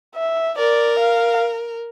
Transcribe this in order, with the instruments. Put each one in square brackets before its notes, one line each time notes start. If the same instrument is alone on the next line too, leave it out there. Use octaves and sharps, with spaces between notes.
[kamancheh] E5
[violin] A#4 [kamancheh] D5
[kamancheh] F5